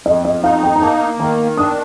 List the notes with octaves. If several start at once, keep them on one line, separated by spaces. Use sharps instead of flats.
F2 D#5
D#5
D#4 F5
G5
A#5
A#3 A5
D#3 A#5
D4 D#6